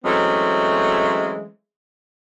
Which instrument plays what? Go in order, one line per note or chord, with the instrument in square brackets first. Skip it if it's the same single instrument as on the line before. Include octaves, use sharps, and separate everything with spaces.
[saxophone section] E3 F#3 G#3 A3 C4 C#4